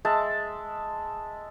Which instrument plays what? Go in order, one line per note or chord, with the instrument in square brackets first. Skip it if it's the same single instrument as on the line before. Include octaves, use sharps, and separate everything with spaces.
[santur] G#3 E5 A5